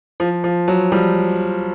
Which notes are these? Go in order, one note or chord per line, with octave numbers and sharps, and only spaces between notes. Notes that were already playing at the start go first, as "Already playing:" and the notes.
F3
F3
F#3
F3 G3